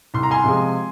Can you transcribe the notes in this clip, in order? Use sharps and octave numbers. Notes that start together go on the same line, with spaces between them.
C2 C6
A#5
G#5 C6
C3 F3 G#3